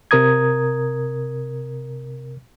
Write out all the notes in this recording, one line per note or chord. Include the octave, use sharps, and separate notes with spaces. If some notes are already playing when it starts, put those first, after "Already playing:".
C3 A#4 A#5 D#6 G#6